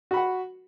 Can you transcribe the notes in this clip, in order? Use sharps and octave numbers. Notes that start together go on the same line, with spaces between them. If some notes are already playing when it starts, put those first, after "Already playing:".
F#4 F#5 B5